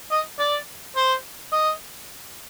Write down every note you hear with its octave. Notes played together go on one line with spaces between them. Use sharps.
D#5
D5
C5
D#5